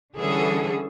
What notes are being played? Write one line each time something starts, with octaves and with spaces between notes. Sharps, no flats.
D3 E3 G3 C#4 G#4 A4